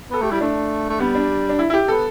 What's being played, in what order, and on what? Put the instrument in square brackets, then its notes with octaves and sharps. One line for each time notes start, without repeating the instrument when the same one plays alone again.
[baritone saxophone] B3 [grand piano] A4
[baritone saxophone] A3 [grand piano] G4
[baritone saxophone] G3 [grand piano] E4
[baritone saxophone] A3 [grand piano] D4
[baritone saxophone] A3
[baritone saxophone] G3 [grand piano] B3
[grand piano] D4
D4
E4
E4
G4
[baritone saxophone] B3 [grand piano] A4